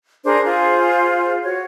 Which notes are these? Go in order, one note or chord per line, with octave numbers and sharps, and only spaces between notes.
D4 G#4 A#4 C5
F4 G#4 C5
F#4 C#5